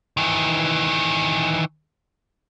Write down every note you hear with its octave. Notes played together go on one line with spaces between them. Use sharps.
D#3 E3